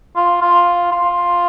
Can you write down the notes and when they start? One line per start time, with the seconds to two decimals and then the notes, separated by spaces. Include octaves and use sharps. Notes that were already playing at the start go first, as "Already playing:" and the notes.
0.16 F4
0.41 F4
0.92 F4